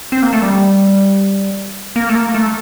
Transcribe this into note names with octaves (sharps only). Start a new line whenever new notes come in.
C4
A#3
A3
G3
A#3
A3
A#3
A3